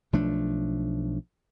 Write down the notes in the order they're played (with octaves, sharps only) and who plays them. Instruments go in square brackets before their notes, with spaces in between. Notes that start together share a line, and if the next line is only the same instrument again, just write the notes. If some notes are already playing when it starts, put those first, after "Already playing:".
[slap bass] B1 F3 A3 D4